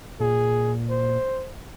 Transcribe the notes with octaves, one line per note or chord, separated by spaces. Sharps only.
A#2 G#4
C5